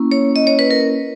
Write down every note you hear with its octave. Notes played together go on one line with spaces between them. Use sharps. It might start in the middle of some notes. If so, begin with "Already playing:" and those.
Already playing: A#3 C#4 E4
C#5
D#5
C#5
B4
A#4